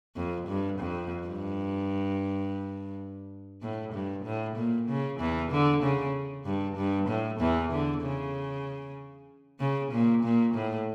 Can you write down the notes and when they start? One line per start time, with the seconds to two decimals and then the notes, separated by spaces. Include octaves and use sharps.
0.16 F2
0.47 G2
0.79 F2
1.27 G2
3.62 A2
3.93 G2
4.25 A2
4.57 A#2
4.88 C#3
5.19 E2 E3
5.51 D3
5.83 C#3
6.45 G2
6.76 G2
7.08 A2
7.40 E2 E3
7.71 D3
8.02 C#3
9.60 C#3
9.92 A#2
10.23 A#2
10.54 A2